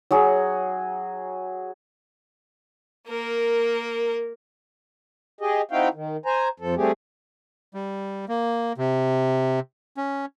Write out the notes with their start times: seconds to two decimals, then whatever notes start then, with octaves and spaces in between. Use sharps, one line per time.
0.11 F#3 F#4 G#4
3.07 A#3 A#4
5.41 G4 G#4 D#5
5.71 C4 D#4 E4 F#4 F5 G5
5.94 D#3
6.26 C5 G#5 A#5
6.60 F2 F3 A4
6.76 G3 A3 C4 G4 G#4
7.74 G3
8.28 A#3
8.78 C3
9.97 C#4